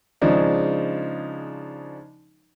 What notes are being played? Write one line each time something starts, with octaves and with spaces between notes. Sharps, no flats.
C#3 F3 G#3 D4 D#4